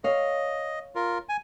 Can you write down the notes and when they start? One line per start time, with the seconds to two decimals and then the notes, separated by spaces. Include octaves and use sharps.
0.04 C#5 D#5 F5
0.95 F4 A#4
1.29 G#5